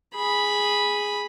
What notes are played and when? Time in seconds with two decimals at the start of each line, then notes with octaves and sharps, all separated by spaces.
0.15 G#4 B5